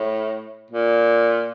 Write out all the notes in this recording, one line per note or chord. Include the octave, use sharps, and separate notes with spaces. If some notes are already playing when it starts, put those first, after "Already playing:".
Already playing: A2
A#2